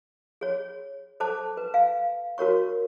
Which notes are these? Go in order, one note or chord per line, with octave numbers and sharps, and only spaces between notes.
G#4 C#5
A4 C5 A5 D6
B4
F5
F#4 A#4 C#5 C#6